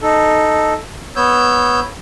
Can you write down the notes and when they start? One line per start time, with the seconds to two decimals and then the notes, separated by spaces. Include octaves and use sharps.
0.01 D#4 A4
1.16 B3 C#5 E6 G6